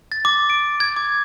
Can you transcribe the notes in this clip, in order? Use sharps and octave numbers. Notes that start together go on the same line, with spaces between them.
A6
D6
D7
G#6
D6